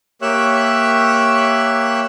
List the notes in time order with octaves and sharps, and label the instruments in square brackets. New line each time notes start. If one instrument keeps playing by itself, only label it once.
[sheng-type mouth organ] A#3 G4 C#5 E5 E6 F#6